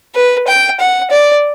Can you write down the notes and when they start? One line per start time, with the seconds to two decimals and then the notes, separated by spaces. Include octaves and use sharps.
0.15 B4
0.47 G5
0.80 F#5
1.11 D5